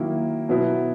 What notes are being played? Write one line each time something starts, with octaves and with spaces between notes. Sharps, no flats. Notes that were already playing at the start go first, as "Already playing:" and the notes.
Already playing: D#3 F#3 A#3 E4
B2 F#3 B3 E4